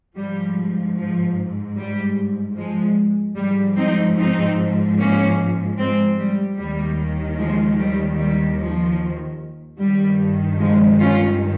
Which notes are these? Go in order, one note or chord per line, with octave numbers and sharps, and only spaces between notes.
G#2 F3 G3
F3
G3
F3 G#3
G#2 F3 G3
C4 D#4
C4 D#4
A#3 C#4
G#3 C4
G3
D#2 D#3 G3
F3 G#3
G3
G3
F3
G2 D#3 G3
F3 G#3
C#4 F4